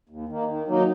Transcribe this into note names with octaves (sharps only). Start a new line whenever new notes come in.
D#2
D#3 A#3
D#3
F#3 A#3 D#4